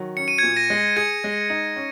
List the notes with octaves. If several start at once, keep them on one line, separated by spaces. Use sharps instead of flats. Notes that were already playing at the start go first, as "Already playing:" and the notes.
Already playing: D#3 F#3
C#4 C#7
D#7
A#2 G#6 C#7
A#6 D#7
G#3
G#4 G#6 C#7
G#3
D#4
C#4